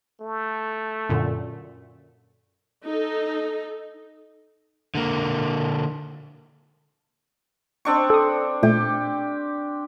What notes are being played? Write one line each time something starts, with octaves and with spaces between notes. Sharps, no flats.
A3
F#2 A#2 D3
D#4 A4
D3 A#3
C4 D4 C#6
A4 D#6
A#2 A3 G4